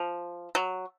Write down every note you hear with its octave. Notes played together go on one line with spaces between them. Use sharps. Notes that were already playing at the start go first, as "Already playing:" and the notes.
Already playing: F3
F#3